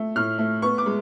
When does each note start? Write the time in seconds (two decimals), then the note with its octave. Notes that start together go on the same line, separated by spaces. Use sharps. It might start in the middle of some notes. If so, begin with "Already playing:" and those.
Already playing: A3
0.16 A2 F6
0.38 A3
0.62 B3 C#6
0.78 D6
0.86 G#3